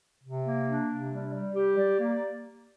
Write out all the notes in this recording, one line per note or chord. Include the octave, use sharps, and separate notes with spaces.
C3
A#3
D4
C3
G3
G3
G4
D5
A#3